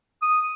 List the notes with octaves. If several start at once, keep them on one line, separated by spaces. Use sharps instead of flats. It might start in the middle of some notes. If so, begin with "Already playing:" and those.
D#6